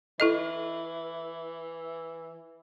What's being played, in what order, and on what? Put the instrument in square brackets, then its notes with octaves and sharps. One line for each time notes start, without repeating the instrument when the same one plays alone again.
[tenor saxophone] E3 [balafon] E4 A4 D#5